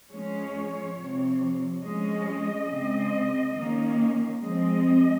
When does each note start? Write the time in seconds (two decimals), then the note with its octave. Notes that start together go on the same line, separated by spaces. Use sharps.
0.11 F3 G#3 C#4 C#5
0.97 C3 F3 C4
1.83 F3 G#3 C#4 D#5
2.69 C#3 G#3 C4
3.56 D#3 A#3 C#4
4.41 F3 G#3 C4 D#5